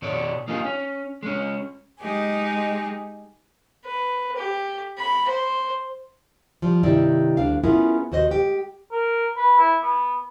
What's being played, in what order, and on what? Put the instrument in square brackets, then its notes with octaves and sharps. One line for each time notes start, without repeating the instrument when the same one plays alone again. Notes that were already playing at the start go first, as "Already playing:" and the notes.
[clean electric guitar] B2 C#5 D5
A#3 D#4 F4 G#4
C#4
G#3 C#4
[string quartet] G#3 D#4 G4 G#4
[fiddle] B4
G4
B5
C5
[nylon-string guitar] F3 G3
G2 C3 D#3 E4 G4 D5
D2 G3 D4 F5
B3 C#4 E4 F4 G#4 A#4
D#2 F#4 C5 D#5
G#3 G4
[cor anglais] A#4
B4
E4
B3